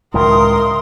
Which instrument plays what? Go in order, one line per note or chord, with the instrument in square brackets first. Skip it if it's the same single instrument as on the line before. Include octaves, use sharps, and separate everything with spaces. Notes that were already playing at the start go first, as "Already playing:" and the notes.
[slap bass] C#2 A2 D#3 [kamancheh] A#4 [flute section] C6 D#6